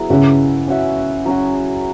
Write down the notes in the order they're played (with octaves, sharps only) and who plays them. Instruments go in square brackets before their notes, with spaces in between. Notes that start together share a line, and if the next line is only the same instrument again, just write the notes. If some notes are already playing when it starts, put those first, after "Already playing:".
Already playing: [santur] F#3 B3 E4 G#4
[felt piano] C#3 [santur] C#4 F#4 E5
[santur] C#4 F#4 E5
F#3 C#4 F#4